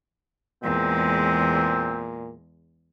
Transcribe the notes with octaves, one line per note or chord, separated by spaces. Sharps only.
E2 A#2 G#3 C4